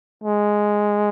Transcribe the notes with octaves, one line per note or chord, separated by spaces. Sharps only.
G#3